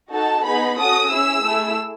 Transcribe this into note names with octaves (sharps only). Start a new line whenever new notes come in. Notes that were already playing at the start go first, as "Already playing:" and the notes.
D#4 F#4 A4 A5
B3 D#4 G#4 B5
C#4 F#4 A4 D#6
C#4 E4 G#4 E6
A3 E4 G#4